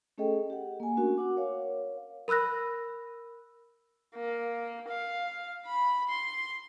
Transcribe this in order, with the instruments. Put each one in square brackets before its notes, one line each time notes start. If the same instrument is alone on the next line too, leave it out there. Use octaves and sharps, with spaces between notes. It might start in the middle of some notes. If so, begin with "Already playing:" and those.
[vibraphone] A3 C#4 G#4 A4 D#5 G5
G4 F#5
A#3 G#5
A3 C#4 D4 F#4 A#4
F#4 F#5 D6
A#4 C#5 F5
[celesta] A#4 B5 E6 F#6 A#6
[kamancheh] A#3
F5
B5
C6